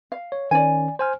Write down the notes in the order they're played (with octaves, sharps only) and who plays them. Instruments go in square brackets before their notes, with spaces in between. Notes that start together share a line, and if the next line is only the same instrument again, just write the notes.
[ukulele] F5
[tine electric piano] C#5
[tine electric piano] D#3 C#4 [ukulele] D5 G#5
[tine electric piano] C5 G#5 F6